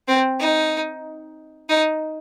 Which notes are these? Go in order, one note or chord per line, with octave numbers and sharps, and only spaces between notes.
C4
D#4
D#4